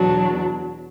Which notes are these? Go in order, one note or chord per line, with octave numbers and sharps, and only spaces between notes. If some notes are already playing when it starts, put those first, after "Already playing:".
Already playing: E2 B2 F#3 D4